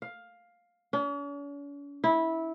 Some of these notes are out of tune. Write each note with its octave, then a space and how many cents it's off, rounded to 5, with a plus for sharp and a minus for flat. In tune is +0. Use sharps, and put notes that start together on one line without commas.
F5 +10
C#4 +45
E4 -15